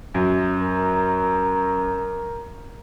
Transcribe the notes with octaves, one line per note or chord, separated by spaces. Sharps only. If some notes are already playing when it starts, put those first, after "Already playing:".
F#2
A#4